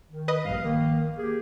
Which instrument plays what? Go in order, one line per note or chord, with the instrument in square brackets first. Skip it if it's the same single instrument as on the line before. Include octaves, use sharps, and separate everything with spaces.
[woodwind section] D#3
[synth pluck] B4 D#5 D#6
[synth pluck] A#1 G2 [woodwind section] F5
[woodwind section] D#3 A#3
A#3 G4 G#4